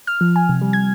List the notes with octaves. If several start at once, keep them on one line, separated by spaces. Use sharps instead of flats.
F6
F3
G#5
C3
G3
G#6